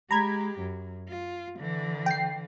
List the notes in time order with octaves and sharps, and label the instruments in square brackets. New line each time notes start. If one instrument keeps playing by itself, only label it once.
[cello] G#3 G4 [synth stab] A#5 B5 G#6
[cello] F#2
F4
D3 E3
[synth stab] G5 C7